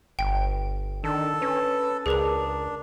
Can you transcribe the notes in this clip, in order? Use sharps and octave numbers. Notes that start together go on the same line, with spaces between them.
G1 G5
D#3 D4 A4
C#4 B4
C#2 D4 G#4 A#4 B4 F7